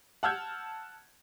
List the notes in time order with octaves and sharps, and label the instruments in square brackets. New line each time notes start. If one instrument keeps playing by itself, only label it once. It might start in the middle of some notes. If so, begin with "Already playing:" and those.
[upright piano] F#5 A5 E6 F6 G6 G#6